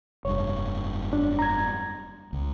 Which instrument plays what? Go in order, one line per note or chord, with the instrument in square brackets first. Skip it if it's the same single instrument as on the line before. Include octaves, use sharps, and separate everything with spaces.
[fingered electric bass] F1 G2 [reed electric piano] C#5
[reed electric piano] D4
A#5 G#6
[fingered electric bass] C#2